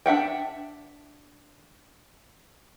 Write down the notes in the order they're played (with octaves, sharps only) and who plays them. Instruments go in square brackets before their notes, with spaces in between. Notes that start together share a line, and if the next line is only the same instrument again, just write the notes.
[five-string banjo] D4 E5 F#5 G5